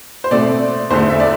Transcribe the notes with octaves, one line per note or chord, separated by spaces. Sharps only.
C5
B2 A3 C4 D5
E2 D3 A3 C5
E5
D5